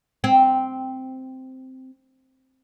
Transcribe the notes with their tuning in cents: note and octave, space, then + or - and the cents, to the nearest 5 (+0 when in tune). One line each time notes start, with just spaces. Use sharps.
C4 -5